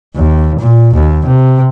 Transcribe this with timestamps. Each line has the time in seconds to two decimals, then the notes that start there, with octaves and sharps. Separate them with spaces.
0.16 D#2
0.59 A#2
0.94 D#2
1.26 C3